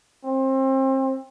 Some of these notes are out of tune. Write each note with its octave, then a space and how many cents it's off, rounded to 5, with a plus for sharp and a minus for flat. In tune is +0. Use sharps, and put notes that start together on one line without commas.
C4 +30